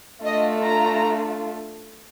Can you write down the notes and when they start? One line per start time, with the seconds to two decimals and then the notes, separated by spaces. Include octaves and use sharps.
0.23 A3 D4 F4 D#5
0.64 A#5